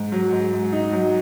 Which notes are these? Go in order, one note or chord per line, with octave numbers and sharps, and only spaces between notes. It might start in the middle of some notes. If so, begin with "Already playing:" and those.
Already playing: G#2
F#3
G#2
G#2
D#4
F#3